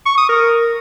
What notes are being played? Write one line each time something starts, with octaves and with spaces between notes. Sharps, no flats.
C#6
D#6
A#4